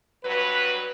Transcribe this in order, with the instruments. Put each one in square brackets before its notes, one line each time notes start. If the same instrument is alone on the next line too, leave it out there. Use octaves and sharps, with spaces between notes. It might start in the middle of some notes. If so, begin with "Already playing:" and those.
[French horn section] G2 F#3 B4